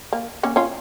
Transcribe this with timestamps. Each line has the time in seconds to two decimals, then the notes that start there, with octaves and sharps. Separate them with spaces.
0.13 A#3
0.43 A#3 C#4
0.56 C#4 F4